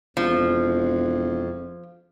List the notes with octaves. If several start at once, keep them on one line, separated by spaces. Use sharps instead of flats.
E1 F2 F3